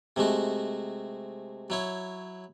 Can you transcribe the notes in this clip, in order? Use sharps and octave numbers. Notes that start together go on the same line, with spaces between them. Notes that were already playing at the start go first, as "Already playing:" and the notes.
C3 G#3 A3 F#4
F#3 E4 C#5